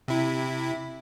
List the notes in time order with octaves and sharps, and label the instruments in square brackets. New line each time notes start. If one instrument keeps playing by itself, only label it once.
[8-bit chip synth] C3 E4